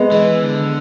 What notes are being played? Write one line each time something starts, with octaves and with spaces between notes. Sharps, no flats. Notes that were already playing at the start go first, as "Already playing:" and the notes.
Already playing: G#3 B3
E3
D3